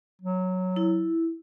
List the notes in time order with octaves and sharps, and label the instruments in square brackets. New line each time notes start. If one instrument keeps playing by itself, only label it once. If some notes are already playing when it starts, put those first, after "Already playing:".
[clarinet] F#3
[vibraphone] E4